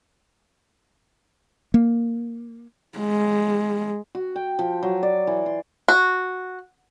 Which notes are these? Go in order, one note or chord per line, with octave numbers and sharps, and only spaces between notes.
A#3
G#3
F#4
G5
F3
F#3
D5
E3
C6
F#4